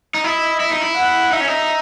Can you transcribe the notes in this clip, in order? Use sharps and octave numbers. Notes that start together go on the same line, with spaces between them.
D#4
E4 D#5
E4 E5
D#4
E4
F#5
D#4 E5
C#4
D#4